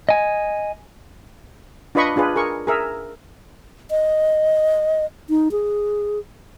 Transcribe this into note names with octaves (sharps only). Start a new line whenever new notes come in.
D#5 G#5
D4 F4 B4 D#5 B5 C#6
D4 F4 G#4 B4
G#4 A#4 C#6
G#4 A#4 E5
D#5
D#4
G#4